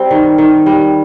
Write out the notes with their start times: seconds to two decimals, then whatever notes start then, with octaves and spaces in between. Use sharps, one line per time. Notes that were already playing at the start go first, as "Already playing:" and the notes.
Already playing: G3 C4
0.11 D#3
0.38 D#3
0.66 G3